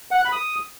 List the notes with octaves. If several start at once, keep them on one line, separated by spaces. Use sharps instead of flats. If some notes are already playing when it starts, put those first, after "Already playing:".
F#5
F#6
B5
D#6